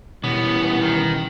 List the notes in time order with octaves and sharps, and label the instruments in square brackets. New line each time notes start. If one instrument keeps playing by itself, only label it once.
[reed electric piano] B2 [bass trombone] E3 [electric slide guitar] G3 C#4 [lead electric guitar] B3
[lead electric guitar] D#3